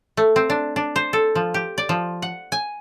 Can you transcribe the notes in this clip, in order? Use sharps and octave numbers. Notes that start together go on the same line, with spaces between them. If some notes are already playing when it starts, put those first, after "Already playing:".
A3
C4
D4
D4
C5
A4
F3
G4
D5
F3
F#5
G#5